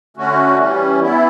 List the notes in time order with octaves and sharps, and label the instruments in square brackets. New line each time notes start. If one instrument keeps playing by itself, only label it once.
[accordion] D3 A3 C#4 F#4
E3 G3 C#4
E3 B3 E4